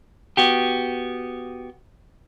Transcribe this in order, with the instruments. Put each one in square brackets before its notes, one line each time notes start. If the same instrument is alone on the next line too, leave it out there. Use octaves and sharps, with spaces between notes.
[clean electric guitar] B3 F#4 G4